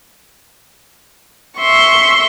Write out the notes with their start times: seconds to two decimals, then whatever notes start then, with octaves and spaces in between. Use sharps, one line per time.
1.59 E5 C6 C#6